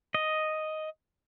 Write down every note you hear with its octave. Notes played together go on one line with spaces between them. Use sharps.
D#5